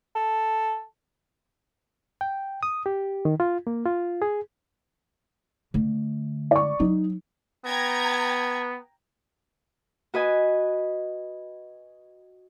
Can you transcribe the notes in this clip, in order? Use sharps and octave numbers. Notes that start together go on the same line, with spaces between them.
A4
G5
D#6
G4
D#3
F4
A#3
F4
G#4
D3 A3
D5 C#6
F#3 D#4
B3 G5 A#5 G#6
F#4 B4 D#5 G#5